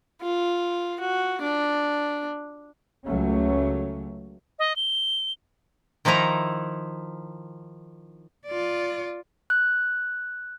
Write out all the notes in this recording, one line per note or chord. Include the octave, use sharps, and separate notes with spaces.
F4
F#4
D4
C#2 F#3 A3 C#4
D#5
G7
D#3 F3 D#4 E4 A#5
F4 D5
F#6